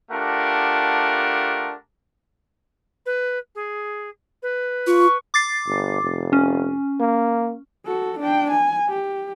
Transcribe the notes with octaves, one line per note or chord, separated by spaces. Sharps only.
A3 D4 F4 G4 A#4 F#5
B4
G#4
B4
F4 C#6
D6 A6 C7
G1
F1
C#4
A#3
F#4 A4
D4 G5
G#5
G4